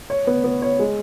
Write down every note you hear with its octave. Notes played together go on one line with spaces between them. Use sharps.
C#5
B3
B3
C#5
G#3